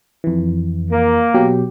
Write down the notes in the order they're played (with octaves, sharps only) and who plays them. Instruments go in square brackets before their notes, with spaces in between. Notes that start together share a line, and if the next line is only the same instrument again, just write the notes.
[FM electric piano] F2 E3
[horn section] A#3
[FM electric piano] B2 F#3 G4